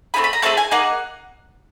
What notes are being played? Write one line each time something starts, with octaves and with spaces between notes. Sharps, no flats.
A3 C4 E4 G#4 B5
B5
A#5
A3 C4 E4 G#4 A5
G#5
A#3 D#4 G#4 F#5